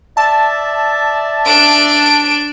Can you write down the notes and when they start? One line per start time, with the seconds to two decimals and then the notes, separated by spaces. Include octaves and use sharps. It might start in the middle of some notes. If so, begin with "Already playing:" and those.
0.17 D5 E5 A5
1.46 D4 D7